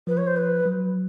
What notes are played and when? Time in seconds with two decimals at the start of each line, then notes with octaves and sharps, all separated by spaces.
0.07 F3 B4
0.17 C#5
0.26 C5
0.36 B4
0.65 F#3